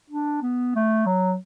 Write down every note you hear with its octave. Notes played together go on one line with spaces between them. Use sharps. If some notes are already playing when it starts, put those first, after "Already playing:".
D4
B3
A3
F#3